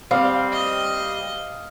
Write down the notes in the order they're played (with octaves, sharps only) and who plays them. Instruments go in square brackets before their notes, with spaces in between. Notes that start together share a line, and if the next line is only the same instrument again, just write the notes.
[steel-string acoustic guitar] G3 C4 [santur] F5
[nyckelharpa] D#5